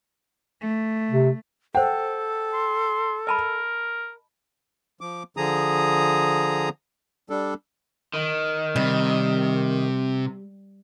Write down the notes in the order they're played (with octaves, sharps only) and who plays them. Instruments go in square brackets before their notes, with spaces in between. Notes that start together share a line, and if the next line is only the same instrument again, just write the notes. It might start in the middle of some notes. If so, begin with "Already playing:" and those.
[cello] A3
[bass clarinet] C3
[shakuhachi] A4 [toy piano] C5 F#5 [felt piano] G5
[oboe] C6
[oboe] A#4 [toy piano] D#5 A5 B5
[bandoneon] F3 D6
D3 F3 G#4 A#5 D#6
G3 D4 A4
[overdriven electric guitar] D#3
[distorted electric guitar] C3 [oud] G3